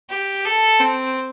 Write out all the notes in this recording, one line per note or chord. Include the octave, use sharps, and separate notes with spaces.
G4
A4
C4